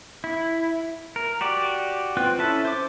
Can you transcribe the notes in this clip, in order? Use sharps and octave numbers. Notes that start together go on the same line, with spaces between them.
E4
A#4
F#4 G4 D5
C4 F4 B4 G5 F#6
C#4 E4 A4 E5 A5
C5 D6